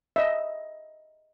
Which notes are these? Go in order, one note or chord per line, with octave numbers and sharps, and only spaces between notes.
D#5 E5